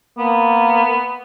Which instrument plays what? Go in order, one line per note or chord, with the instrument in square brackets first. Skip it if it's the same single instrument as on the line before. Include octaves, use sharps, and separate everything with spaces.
[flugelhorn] A#3 [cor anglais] B3